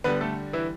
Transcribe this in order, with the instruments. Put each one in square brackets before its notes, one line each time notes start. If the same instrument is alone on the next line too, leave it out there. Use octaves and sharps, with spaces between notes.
[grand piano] D3 G3 B3 B4
A3 A4
E3 E4